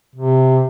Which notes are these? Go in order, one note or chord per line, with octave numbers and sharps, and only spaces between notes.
C3